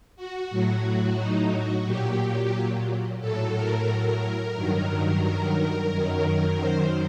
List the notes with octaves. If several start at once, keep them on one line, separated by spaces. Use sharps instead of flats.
F#4
A2 F#3
D#4
F#4
A#2 F#3 G4
A2 F#3 A4
A#4
G2 D#3 F#3
A#4
F#2 D#3 F#3
C5